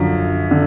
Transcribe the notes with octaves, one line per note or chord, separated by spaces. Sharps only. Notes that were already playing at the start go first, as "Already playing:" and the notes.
Already playing: F#2 D3 F3
D3